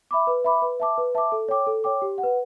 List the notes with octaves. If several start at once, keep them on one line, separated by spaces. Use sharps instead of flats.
E5 B5 D6
B4
E5 B5 D6
B4
E5 A5 D6
B4
E5 A5 D6
A4
C#5 G5 D6
A4
C#5 G5 D6
G4
F#5
B4